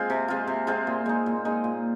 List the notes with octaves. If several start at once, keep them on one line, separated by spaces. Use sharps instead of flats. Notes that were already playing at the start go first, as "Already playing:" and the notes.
Already playing: G#3 C4 F4
C3
G#3 C4 F4
C3
G#3 C4 F4
A#2
G#3 D#4
A#2
G#3 D#4
A#2